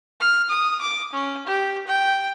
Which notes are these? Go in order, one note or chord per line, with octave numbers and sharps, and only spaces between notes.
F6
D#6
D6
C#4
G4
G5